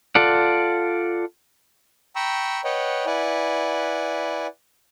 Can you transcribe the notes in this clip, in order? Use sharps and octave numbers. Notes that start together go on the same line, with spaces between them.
F4 A4 D5 F#5
G5 A#5 B5 C#6 E6
B4 C#5 D#5 F#5 G5
E4 B4 D5 F#5 G#5